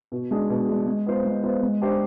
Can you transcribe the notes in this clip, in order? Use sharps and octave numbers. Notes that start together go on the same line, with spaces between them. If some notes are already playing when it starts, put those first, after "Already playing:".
B2
G#3 D4 G#4
B2
G#3 D4 G#4
G#3
B3 F4 C5
G#3
B3 F4 C5
G#3
D4 G4 C5